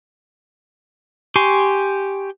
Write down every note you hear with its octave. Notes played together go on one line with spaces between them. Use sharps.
G4 G#5 C6 C#6